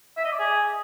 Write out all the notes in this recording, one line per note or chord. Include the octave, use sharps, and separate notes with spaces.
E5
D#5
D5
G#4